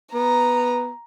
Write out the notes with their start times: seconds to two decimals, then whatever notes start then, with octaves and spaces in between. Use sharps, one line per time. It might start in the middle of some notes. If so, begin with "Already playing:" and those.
0.14 B3 A#5